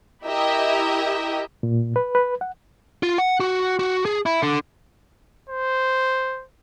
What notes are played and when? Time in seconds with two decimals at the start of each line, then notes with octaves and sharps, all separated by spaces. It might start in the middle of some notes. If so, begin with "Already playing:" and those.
0.25 E4 G4 A#4 D#5 E5
1.63 A#2
1.96 B4
2.15 B4
2.41 F#5
3.03 F4
3.18 F#5
3.40 F#4
3.79 F#4
4.05 G#4
4.26 E4
4.42 D3
5.50 C5